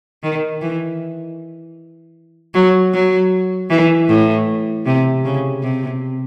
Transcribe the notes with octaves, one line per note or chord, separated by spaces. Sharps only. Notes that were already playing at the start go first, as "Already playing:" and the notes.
D#3
E3
F#3
F#3
E3
A2
C3
C#3
C3